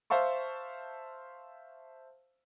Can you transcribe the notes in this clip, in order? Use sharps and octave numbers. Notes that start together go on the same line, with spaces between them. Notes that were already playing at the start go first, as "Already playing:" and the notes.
C5 E5 F5 A5 C#6